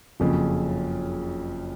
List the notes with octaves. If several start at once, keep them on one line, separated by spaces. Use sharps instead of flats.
F#1 F2 C#3 F3